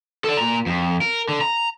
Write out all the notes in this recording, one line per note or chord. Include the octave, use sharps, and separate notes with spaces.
A4 D5
A#2 A#5
F2
A#4
D3
A#5